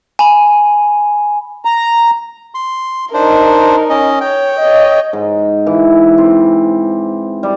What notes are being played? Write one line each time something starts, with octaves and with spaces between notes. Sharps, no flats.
G#5 B5
A#5
C6
D4 D#4 A#4 C5
C#4 D#5
C#5 G5
C#5 D#5
G#2
E3
C4
G3